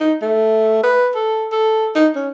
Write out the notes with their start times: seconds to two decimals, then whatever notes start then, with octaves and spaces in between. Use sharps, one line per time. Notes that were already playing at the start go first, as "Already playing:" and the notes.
0.01 D#4
0.22 A3
0.83 B4
1.15 A4
1.52 A4
1.95 D#4
2.15 C#4